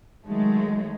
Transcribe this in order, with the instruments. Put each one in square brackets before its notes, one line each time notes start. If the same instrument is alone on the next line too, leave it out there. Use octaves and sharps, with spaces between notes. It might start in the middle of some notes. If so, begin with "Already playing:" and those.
[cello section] D#3 F#3 G#3 A3